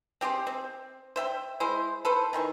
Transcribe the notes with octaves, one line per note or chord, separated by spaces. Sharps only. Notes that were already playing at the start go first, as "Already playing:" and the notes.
C4 G4 G#4 C5
C4
C5 E5 G5
G#3 E4 C5
A4 B4 C5
D#3 E3 C6 C#6